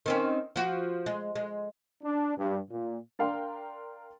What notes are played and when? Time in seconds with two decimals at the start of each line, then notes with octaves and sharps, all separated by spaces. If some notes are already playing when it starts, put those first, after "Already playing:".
0.06 D#3 C4 C#4
0.56 F3 F#4
1.06 G#3
1.36 G#3
2.03 D4
2.37 G2
2.70 A#2
3.19 D4 A#4 F5 G5 C6